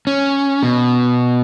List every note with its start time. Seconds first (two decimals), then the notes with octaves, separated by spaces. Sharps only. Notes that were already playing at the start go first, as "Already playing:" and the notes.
0.07 C#4
0.63 B2